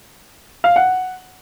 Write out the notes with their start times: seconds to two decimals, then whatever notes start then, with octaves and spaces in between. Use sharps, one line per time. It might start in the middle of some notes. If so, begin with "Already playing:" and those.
0.64 F5
0.76 F#5